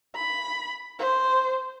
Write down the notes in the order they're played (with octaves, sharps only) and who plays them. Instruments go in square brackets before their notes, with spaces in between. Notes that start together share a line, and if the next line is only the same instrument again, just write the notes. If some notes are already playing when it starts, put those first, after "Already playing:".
[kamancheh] B5
C5